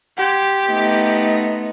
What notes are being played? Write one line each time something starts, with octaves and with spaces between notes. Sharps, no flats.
G4 F#5 C6 G#6
A3 B3 D#4